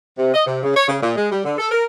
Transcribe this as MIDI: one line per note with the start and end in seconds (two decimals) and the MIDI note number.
0.18 0.31 48
0.34 0.43 75
0.46 0.60 48
0.63 0.73 49
0.75 0.85 73
0.88 0.97 49
1.02 1.15 46
1.16 1.30 56
1.32 1.43 55
1.44 1.54 50
1.58 1.69 69
1.71 1.84 70